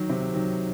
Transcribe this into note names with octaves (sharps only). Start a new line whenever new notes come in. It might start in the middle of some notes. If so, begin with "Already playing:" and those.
Already playing: D#3 F#3
C3
D#3 F#3